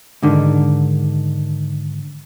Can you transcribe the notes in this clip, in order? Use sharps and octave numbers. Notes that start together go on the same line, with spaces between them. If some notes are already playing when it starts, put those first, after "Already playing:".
G#2 D3 D#3